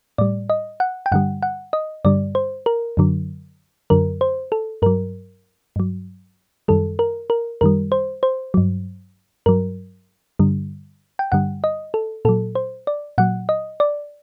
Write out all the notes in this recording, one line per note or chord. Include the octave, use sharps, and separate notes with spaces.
A2 G3 D5
D#5
F#5
G5
G2 D3 G3 F#5
F#5
D#5
G2 D3 G3 D5
C5
A#4
F#2 D3 F#3
F#2 D3 F#3 A#4
C5
A4
G2 F#3 A#4
G2 F#3
F#2 D#3 G3 A4
A#4
A#4
F#2 D#3 G3 A#4
C5
C5
G2 F#3
G2 F#3 A#4
G2 D3 G3
G5
G2 D3 G3 F#5
D#5
A4
A#2 F#3 A4
C5
D5
A#2 F#3 F#5
D#5
D5